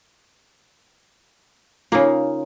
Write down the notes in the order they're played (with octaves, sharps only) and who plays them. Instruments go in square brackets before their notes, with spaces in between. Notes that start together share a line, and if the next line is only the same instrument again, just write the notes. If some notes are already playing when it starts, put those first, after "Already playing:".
[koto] C#3 A#3 [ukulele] D#4 F4